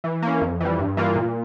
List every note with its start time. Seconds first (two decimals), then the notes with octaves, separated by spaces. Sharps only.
0.04 E3
0.22 A#3 C#4
0.41 F2
0.61 E3 G3
0.79 G2
0.97 E3 A#3 F4
1.16 A#2